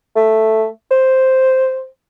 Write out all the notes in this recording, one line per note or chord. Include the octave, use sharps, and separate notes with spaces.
A3
C5